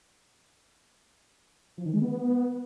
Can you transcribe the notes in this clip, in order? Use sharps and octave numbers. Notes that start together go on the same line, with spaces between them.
F3
D#3
G#3
B3